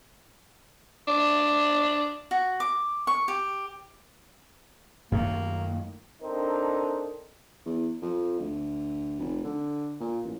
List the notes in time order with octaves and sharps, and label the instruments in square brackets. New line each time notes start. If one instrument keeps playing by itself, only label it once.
[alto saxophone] D4
[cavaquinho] F#4
D6
C#6
G4
[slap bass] F#2 D#3 A3 [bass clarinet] A#3
[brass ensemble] C4 D4 D#4 A4 A#4
[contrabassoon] E2
F2
D2
F1
D3
A#2
A1